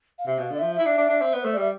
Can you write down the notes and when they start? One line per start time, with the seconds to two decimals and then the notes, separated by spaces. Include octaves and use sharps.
0.19 F5
0.27 C3 E5
0.39 B2 F5
0.50 D3 D5
0.59 F3 E5
0.74 E4 E5
0.86 D4
0.98 D4
1.09 D4
1.21 C4
1.33 B3 B4
1.43 A3 C5
1.52 D5
1.57 G3 E5